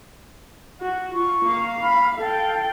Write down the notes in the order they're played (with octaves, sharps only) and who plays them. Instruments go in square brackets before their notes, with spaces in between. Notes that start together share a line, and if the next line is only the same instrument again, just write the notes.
[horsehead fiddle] F#4
[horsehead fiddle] F4 [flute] C#6
[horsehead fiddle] A#3 F5
[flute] B5
[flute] A4 [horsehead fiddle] F5 G5